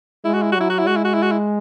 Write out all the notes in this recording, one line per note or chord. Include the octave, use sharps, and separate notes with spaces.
G#3 E4
F#4
E4
F#4
F#3 E4
F#4
E4
G#3 F#4
E4
F#4
E4
F#4
E4